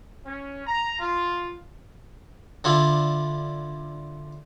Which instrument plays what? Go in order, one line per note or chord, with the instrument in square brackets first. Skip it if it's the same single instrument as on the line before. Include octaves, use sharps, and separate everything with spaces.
[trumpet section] C#4
A#5
F4
[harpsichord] D3 D4 E4 F4